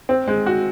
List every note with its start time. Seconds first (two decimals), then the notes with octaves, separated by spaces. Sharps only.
0.09 C4
0.28 G#3
0.46 F#4